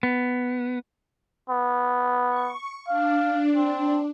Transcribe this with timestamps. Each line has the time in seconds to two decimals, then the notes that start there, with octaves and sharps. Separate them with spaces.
0.03 B3
1.50 B3
2.30 C#6
2.88 D4 F5
3.56 C4